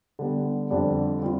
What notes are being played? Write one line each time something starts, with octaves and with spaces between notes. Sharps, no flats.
D3 G3 B3
F2 D3 G3 D4
G3 C4 F4